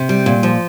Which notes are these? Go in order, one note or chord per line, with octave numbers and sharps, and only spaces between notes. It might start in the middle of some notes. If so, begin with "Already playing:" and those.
Already playing: C3
G3
A#2
F3